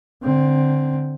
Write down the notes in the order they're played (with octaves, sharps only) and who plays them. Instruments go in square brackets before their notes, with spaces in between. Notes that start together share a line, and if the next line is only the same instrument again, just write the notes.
[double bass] D3 C4